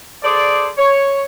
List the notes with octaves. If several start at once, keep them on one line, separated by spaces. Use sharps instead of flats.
G#4 A4 C5 D5
C#5